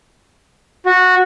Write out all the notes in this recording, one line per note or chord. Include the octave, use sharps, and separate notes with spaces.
F#4